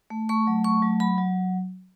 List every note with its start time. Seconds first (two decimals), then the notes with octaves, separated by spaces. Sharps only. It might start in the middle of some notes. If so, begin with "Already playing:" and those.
0.10 A3
0.29 A3 C#6
0.47 F#3
0.64 A3 C#6
0.82 F#3
1.00 F#3 B5
1.18 F#3